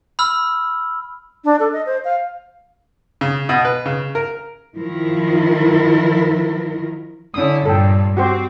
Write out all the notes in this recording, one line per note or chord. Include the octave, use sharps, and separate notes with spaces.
B5 E6 F6
D4
A4
D#5
C5
F5
C#3
B2
B4
C#3
A#4
D#3 F3 E4 A#4
D3 C#4 E4 D#6
G2 A#2 A4 G5
C4 F#4 G4 C5